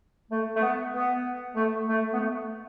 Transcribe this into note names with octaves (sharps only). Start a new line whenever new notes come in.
A3
A3
B3
B3
A3
A3
B3
A3